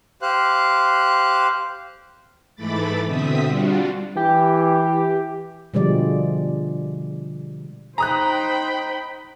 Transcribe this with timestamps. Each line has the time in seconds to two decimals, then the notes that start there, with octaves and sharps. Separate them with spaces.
0.22 G4 C5 F5 F#6
2.56 G#2 E3 A3 B5 D6 A6
3.06 B2 D3 C4 E5 D#6 B6
3.46 G3 D4 F4 F#4
4.16 E3 G4
5.74 B2 D3 F3 G3 G#3 D5
7.98 D#4 C5 G5 A#5 B5 D#6 F#6